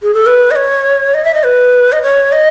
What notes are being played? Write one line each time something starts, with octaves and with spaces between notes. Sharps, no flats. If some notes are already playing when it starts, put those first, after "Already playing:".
G#4
A4
B4
D#5
C#5
D#5
E5
D#5
B4
D#5
C#5
D#5